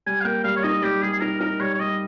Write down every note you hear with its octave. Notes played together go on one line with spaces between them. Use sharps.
G3 G#5
F5
A#3 G5
G3 F5
C#5
D#4 D#5
G3 G4
G3 G#4
G#4
D#4 A#4
D#4 A#4
G3 C#5
C#5
G3 D#5